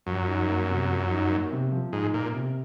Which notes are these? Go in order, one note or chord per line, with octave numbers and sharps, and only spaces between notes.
F#2 F3
D#4
A#3
C3
F3
D#4
A#3
C3
F3
G#2 D#4
A#2 A#3
C3